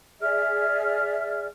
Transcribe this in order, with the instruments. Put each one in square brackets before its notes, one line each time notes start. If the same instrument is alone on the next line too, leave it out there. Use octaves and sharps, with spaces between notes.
[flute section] G#4 D5 E5 F6